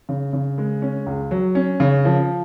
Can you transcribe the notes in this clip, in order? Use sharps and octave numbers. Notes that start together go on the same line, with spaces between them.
C#3
C#3
G#3
C#4
C#2
F#3
C#4
C#3
F3